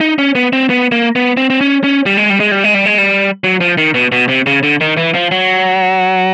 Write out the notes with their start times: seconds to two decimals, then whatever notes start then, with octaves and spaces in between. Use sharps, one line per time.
0.01 D#4
0.18 C#4
0.35 B3
0.53 C4
0.70 B3
0.92 A#3
1.16 B3
1.37 C4
1.50 C4
1.61 C#4
1.84 C#4
2.06 G3
2.17 G#3
2.30 G3
2.40 G#3
2.51 G3
2.64 G#3
2.74 G3
2.86 G#3
2.98 G3
3.44 F#3
3.61 F3
3.77 D#3
3.94 B2
4.12 B2
4.29 C3
4.46 C#3
4.63 D3
4.81 D#3
4.97 E3
5.15 F3
5.31 F#3